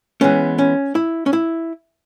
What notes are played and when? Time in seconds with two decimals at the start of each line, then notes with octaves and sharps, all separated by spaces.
0.21 E3 G#3 B3 C#4
0.58 C#4
0.95 E4
1.26 C#4
1.33 E4